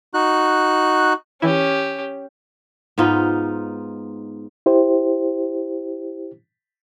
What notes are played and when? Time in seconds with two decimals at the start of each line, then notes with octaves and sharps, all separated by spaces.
0.14 D#4 F#4 F#6
1.42 E3 C#4 E4 G4
2.98 G#2 B3 D#4 F4
4.66 E4 G4 C5